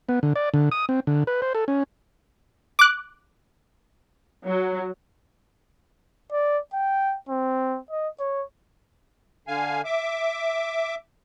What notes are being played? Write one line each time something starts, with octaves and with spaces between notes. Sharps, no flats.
B3
D3
D5
D3
D#6
C4
D3
B4
C5
A4
C#4
D6 F#6
F#3
D5
G5
C4
D#5
C#5
D3 F5 G#5
E5 D6